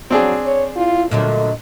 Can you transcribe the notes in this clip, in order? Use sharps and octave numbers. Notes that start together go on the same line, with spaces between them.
F#3 C4 D4 G#4
C#5
E4 F4
A#2 D3 F#3 A3 D#5